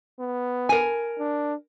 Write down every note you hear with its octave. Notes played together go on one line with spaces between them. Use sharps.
B3
A#4 G#5
D4